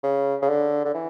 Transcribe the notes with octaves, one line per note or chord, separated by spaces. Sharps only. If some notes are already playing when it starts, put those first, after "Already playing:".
C#3
C#3
D3
D3
E3